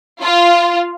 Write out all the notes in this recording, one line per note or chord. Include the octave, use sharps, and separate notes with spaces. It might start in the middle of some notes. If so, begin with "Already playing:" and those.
F4